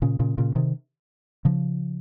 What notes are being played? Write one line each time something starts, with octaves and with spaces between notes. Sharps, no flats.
A#2 C#3
A#2 C#3
A#2 C#3
C3 D#3
C#3 F3